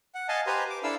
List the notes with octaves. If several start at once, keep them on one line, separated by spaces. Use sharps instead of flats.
F#5
D#5 F5 G#5 A5
G4 B4 C5 G#5 A#5 C6
D6
D4 E4 A4 F5 E6